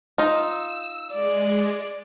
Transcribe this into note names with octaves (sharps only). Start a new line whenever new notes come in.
D#4 F4 E6
G#3 D5